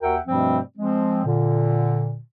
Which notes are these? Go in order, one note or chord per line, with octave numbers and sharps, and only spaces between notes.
D#2 F#4 A#4 E5 F#5 G5
G2 B2 F3 G3 A3 C4
F3 G#3 C4
A#2 D3